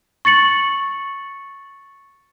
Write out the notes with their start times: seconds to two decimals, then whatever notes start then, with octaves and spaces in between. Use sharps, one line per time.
0.25 C#6 A6 C#7 F#7